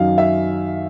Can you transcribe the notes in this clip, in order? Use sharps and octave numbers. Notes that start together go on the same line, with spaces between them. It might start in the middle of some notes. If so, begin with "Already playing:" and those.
Already playing: F#2 D#3 F#3 F5
E5